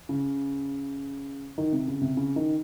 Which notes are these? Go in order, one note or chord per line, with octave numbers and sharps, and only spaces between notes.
C#3
D#3
C3
C#3
C3
C#3
D#3